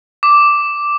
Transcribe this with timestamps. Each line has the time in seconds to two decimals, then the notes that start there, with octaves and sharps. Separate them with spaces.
0.23 D6